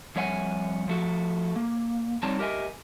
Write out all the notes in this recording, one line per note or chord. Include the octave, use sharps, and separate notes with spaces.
F2 G3 C#5 E5 F#5 G#5
F3 A3 F#4
A#3
G3 C4 D#4 C#5 D5 A5
G4 A#4 D#5 E5 G#5